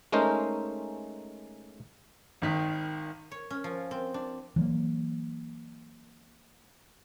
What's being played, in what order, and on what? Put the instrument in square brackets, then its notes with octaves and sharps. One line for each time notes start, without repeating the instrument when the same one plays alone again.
[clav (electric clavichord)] G#3 A3 C#4 D#4 A#4 C5
[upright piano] G#1 D#3 B6
[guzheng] C#5
C#4
F3
C4
D4
[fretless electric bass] E3 F#3 A3 A#3